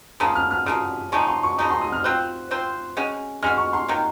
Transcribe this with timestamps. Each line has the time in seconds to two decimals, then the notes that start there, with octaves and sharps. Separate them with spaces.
0.20 C#3 F3 A#3 D#6
0.35 F6
0.51 F6
0.66 C#3 F3 A#3 D#6
1.12 C#3 F3 G#3 D#4 C#6
1.27 C6
1.43 C#6
1.58 C#3 F3 G#3 D#4 D#6
1.70 C6
1.81 D#6
1.92 F6
2.04 C4 F4 C5 F#6
2.51 C4 F4 C5
2.97 G#3 C#4 F#4
3.42 G#3 C#4 F#4 F6
3.58 C#6
3.73 C6
3.88 D#3 F#3 A#3